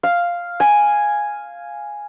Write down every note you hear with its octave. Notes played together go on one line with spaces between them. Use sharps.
F5
G#5